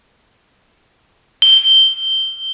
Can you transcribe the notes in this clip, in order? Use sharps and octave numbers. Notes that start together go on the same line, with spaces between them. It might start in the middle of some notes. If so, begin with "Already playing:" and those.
G7